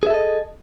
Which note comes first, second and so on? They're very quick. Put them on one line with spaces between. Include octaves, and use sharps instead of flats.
G#4 E5 A4 D#5